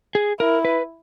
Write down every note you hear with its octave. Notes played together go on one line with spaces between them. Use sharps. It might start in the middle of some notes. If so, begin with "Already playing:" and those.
G#4
E4 A#4
B4